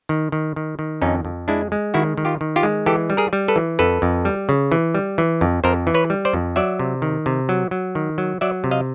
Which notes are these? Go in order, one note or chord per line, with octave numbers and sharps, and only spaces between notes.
D#3
D#3
D#3
D#3
F2 C#4 D#4
F2
G#3 D4 E4
G#3
D#3 E4 F#4
D#3
F4 G4
D#3
F4 G4
G#3
E3 G4 A4
G3
G#4 A#4
G3
A4 B4
E3
F2 A4 B4
F2
G3
C#3
E3
G3
E3
F2
F2 A#4 C5
E3
B4 C#5
G3
C5 D5
F2
F#3 D5 E5
C3
D#3
C3
F#3
F#3
D#3
F#3
F#3 D5 E5
C3
D#5 F5